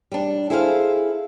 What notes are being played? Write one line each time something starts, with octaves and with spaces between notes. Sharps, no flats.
G3 D4
E4 G#4 A4 C5 E5 F5